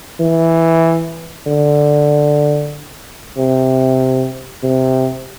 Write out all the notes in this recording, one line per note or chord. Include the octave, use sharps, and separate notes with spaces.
E3
D3
C3
C3